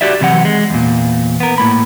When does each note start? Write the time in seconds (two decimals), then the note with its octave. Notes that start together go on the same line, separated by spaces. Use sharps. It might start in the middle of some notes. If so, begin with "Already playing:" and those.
0.01 F#4 G4 D5 E5
0.21 C3 E3 F#3 F#5
0.45 G#3
0.70 E2 A#2
1.40 B3 A#4
1.58 A2 A#3 B5